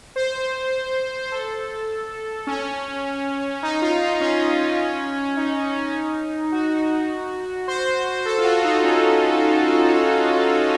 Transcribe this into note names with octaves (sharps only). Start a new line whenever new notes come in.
C5
A4
C#4
D#4
F4
D#4
C#4
D#4
F#4
C5
A4
F4
F#4
D#4
C#4